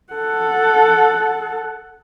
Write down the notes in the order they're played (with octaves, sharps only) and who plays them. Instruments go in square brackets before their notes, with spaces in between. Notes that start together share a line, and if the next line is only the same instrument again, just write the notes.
[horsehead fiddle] A4 F#5